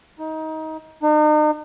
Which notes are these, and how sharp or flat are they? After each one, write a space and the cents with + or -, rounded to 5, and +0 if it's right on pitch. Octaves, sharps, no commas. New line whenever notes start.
D#4 +20
D#4 -40